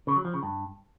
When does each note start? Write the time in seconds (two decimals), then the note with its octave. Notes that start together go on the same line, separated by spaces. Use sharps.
0.07 C#3
0.16 F#3
0.25 F3
0.34 C#3
0.43 G2